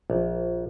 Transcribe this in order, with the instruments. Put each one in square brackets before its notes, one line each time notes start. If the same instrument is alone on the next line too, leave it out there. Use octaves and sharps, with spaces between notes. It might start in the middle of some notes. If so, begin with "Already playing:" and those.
[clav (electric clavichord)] A#1